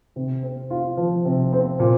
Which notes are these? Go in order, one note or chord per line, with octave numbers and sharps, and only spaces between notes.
C3
C4
F4
F3
C3
C4
A#2